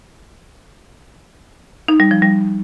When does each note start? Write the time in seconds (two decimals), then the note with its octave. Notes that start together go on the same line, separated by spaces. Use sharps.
1.88 D#4
2.00 G3
2.11 F3
2.22 G3